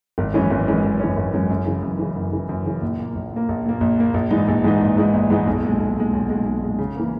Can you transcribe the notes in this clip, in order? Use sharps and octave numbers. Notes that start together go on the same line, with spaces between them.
G#1
F#2 E3 G#3 C#4
G#1
F#2 E3 G#3 C#4
G#1
F#2 E3 G#3 C#4
G#1
F#2 E3 G#3 C#4
F#2
C#3 E3
F#2
C#3 E3
F#2
C#3 E3
F#2
C#3 E3
A#1
A#2 A#3
A#1
A#2 A#3
A#1
A#2 A#3
A#1
A#2 A#3
A#1
G#2 E3 G#3 D#4
A#1
G#2 E3 G#3 D#4
A#1
G#2 E3 G#3 D#4
A#1
G#2 E3 G#3 D#4
B1
A#2 G#3
B1
A#2 G#3
B1
A#2 G#3
B1
A#2 G#3
C#3
E3 A#3